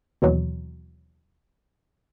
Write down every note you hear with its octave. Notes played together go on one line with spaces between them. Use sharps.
D#2 B2 E3 F#3